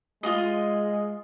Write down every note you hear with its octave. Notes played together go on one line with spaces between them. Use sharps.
G#3 F4 G#4 D#5